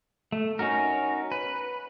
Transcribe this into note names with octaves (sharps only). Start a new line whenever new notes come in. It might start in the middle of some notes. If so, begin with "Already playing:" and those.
A3
C#4 D#4 F#4 A#4
B4